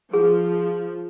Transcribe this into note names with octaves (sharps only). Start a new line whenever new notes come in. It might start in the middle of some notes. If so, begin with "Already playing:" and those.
F3 G#4